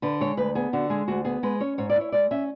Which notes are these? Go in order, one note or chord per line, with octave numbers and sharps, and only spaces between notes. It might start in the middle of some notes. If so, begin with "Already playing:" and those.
D3 B4
G#3 C#5
D2 B4
B3 G#4
D3 F#4
G#3 G#4
D2 F#4
B3 G#4
G#3 B4
C#4 C#5
G#2 C#5
D5
E4
C#5
G#3 D5
C#4 E5